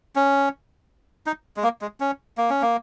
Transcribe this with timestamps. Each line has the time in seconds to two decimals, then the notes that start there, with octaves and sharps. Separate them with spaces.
0.16 C#4
1.26 D#4
1.57 G#3
1.63 A#3
1.81 G#3
2.00 C#4
2.38 A#3
2.50 C#4
2.62 A#3